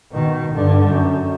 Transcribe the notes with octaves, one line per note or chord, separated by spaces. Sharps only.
B2 D#3
G2 D3
F#2